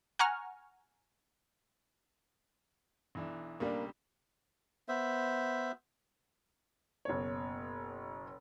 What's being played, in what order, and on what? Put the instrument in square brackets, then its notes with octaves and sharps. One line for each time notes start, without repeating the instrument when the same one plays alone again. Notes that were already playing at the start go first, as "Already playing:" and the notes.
[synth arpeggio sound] F#5 G#5 A#5 C#6 F6
[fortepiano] B1 E3 D4
[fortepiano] B1 C#3 G3 [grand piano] A#3 D4
[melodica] B3 C5 E5
[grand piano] F#1 B2 C#5